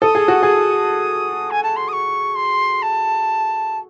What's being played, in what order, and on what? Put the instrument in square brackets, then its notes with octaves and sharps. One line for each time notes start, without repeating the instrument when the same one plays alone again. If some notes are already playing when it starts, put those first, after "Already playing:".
[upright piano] A4 [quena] D#6
[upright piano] G#4
F#4
G#4
[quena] G#5
A5
C6
D#6
C#6
C6
A5